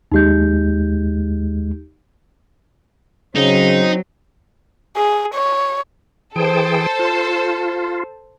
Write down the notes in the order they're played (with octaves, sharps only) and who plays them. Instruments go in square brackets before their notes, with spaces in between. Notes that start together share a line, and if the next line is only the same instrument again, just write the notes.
[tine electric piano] D#2 G#3 [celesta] D#4 G4 G6
[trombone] C#3 [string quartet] F#3 [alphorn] C4 [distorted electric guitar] D#4
[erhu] G#4
C#5
[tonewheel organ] E3 G#4 G5 [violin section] A4 C5
[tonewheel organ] F4